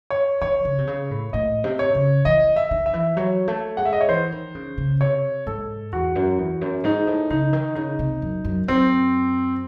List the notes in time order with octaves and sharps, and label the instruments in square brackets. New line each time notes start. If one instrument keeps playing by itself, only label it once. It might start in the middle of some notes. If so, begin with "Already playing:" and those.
[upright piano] C#5
[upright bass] D#3 [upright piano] C#5
[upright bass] C#3
C3
C#3
A2
[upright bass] A2 [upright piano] D#5
[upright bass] C3
[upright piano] C#5
[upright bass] C#3
[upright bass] E3 [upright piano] D#5
[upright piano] E5
[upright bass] D#3
[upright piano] E5
[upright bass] E3
[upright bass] F#3 [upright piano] C#5
[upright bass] A3
[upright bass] G#3 [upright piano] F#5
[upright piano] E5
D#5
C#5
[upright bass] E3 [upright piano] C5
[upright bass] D#3
C#3
C#3
[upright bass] C3 [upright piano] C#5
[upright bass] G#2 [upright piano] A4
[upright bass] E2 [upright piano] F#4
[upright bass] F#2
E2
F#2
[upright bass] G#2 [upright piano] D#4
[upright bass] A2
[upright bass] C#3 [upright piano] D#4
[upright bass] D#3
[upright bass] C#3 [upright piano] D#4
[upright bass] C3
F#2
F#2
[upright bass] F#2 [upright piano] C4